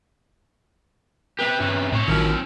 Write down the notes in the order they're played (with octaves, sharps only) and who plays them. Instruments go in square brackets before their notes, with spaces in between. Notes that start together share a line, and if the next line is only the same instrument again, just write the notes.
[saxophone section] B3 B4 [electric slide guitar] C4 G4
[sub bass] G2 [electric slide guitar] C3 C#4
[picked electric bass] A2 [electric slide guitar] C4 C#5
[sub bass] A1 [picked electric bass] D#3 F#3 [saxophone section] F3 E4 A#4